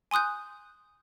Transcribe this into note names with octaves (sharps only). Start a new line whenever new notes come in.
G#5 C6 D#6 F#6 G6